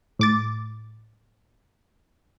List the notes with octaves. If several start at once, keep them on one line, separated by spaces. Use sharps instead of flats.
A2 D6 A6